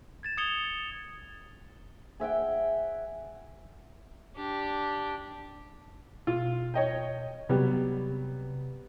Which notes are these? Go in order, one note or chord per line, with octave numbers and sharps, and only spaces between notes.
G#6 A6 E7
D#6 G#6 A6 C#7 F7 G7
G#4 E5 F#5 G5
D4 G4
B2 F4
C#5 D#5 G5
C3 F#3 G3 B3